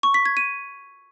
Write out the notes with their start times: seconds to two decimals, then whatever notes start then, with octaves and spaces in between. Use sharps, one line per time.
0.03 C#6
0.14 B6
0.26 G#6
0.37 D#7